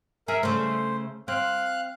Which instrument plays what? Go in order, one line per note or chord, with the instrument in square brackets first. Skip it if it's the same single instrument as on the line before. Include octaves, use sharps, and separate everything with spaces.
[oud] G#4 [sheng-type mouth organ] A#4 E5
[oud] C#3 A3 [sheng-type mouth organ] C5
[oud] C4 [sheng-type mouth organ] F5 F#6